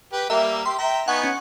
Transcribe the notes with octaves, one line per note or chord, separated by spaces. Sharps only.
G4 B4
G3 A#3 A#4 E5
G4 C6
E5 G5 A#5
B3 D#4 F#5 G#5 C#6
C#4